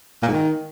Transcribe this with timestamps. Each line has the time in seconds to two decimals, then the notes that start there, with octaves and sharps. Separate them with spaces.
0.22 A#2
0.28 G#2
0.33 D#3